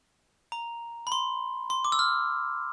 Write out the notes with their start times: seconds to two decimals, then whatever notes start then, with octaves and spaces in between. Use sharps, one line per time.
0.52 A#5
1.07 B5
1.12 C6
1.70 C6
1.84 D6
1.92 E6
1.99 F6